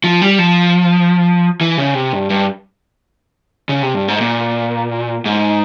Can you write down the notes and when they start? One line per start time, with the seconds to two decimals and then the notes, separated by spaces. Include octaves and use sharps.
0.04 F3
0.22 G3
0.39 F3
1.61 E3
1.78 C#3
1.94 C3
2.13 G2
2.30 G2
3.69 C#3
3.82 C3
3.94 G2
4.08 G#2
4.21 A#2
5.26 G#2